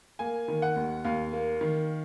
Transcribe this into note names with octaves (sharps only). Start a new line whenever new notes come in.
A#3 G#5
D#3
F#5
D#2
D#2 F5
A#3
D#3